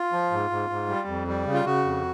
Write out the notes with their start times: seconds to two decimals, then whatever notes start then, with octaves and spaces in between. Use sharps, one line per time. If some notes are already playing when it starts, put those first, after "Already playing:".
Already playing: F4
0.13 F3
0.31 G#2
0.50 G#2
0.70 G#2
0.89 G3
1.07 F2
1.28 G3
1.46 C#3
1.54 F4
1.65 C#3 F#4
1.85 F2